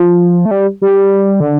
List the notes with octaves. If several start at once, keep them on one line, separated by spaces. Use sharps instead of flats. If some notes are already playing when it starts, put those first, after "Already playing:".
Already playing: F3
A3
G3
G3
D3